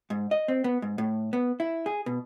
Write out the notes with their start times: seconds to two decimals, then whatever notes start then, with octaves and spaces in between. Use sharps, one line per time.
0.10 G#2
0.31 D#5
0.48 C4
0.64 B3
0.82 G#2
0.98 A2
1.33 B3
1.60 E4
1.86 G#4
2.06 B2